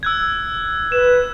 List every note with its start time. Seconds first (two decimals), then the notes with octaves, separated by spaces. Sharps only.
0.03 E6 F#6 G#6
0.92 B4 E7